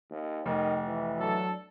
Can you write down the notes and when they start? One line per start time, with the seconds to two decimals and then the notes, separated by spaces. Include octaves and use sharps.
0.11 D#2
0.46 F1 D#3
0.86 E3
1.18 F#3 D4 A4